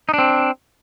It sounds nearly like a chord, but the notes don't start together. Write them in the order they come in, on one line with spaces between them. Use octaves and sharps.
D#4 D4 C4